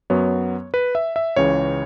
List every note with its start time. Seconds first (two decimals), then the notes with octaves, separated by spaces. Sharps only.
0.10 F#2 F#3 B3 C#5
0.74 B4
0.95 E5
1.16 E5
1.36 C#2 C#3 E3 C#5